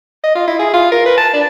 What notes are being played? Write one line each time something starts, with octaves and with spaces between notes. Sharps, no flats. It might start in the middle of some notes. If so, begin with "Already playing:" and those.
D#5
F4
E4
G#4
F4
A#4
B4
A5
D4